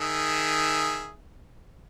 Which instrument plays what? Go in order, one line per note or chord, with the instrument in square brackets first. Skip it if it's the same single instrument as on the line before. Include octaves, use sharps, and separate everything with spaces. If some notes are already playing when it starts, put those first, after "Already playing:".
[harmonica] D#3 G#4 E5